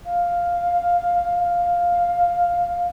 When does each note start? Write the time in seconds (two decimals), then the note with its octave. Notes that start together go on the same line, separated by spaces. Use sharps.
0.06 F5
1.39 F5